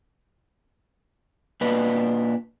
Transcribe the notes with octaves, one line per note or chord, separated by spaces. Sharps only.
A#2 D4 B4 D#5